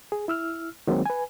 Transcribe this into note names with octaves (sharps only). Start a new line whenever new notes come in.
G#4
E4 E6 F6
D#3 F#3 G#3 A#3 C4
B4 G#5